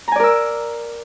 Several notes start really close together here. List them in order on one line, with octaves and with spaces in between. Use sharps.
A#5 G#5 D5 A#4 E6